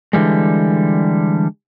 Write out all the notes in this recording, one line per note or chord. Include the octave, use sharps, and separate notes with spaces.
D3 E3 G3 G#3